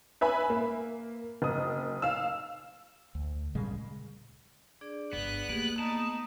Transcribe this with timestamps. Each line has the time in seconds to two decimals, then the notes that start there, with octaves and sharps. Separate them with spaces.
0.21 B4 E5 G#5 B5
0.50 A#3
1.42 F#1 D#6
2.02 F5 E6
3.15 D2
3.55 A#2 C#3 G3 G#3
4.81 D4 G#4 D5
5.13 G1 B3 D5 F#6
5.49 A3 A#3 G4 G#4
5.79 A3 B3 D#4 A5